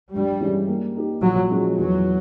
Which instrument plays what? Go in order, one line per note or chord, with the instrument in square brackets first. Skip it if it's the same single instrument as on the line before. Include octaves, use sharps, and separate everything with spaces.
[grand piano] G2 [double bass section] G3
[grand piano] E3 G#3 C#4
A#3
D#4 G4
[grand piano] A#2 [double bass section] F#3
[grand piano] F3 G#3 C#4 F#4
[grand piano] E2 [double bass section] F#3